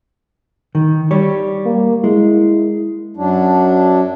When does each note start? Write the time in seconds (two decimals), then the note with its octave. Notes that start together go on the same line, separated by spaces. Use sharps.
0.75 D#3
1.11 G3 C#5
1.66 A#3
2.04 G#3 E4
3.17 F#2 F#3 D4